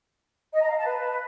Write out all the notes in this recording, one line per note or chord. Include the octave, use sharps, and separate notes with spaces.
D#5
A#5
F5
A5
B4